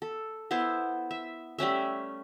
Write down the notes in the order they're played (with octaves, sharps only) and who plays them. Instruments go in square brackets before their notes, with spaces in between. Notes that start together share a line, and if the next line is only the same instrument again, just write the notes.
[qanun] A4
B3 E4 C5 A5
E5
G3 A3 C#4 E5